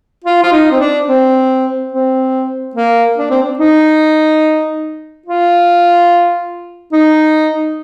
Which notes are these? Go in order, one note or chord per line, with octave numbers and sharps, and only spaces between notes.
F4
F4
D#4
C4
D4
C4
C4
A#3
D4
C4
D4
D#4
F4
D#4